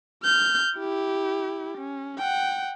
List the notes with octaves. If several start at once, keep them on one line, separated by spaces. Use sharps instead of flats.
F6 G6
E4 G4
C#4
F#5 G5